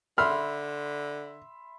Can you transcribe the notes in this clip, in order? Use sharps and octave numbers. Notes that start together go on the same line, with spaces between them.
D3 E5 B5 C6 F6